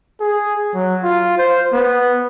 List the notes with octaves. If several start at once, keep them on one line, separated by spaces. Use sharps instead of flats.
G#4
F#3
F4
C5
B3